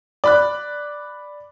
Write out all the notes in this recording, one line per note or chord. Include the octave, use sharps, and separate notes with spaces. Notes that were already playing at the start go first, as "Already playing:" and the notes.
D5 B5 F#6